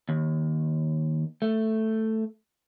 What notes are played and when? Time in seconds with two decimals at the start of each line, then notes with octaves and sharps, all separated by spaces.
0.09 D#2
1.42 A3